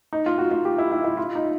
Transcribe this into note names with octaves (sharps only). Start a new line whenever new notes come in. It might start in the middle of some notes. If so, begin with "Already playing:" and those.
D#4
F4
F#4
F4
G4
E4
E4
E4
F4
D#4